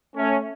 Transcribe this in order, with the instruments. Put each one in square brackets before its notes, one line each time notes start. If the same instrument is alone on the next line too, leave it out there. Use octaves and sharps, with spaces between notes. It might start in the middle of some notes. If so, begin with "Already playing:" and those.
[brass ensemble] A3 C#4